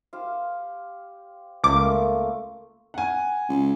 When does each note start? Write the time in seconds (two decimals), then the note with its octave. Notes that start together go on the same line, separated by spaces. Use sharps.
0.13 G4 C5 F5
1.64 C#2 A3 A#3 C5 D6
2.94 F#5 G#5
3.49 C#2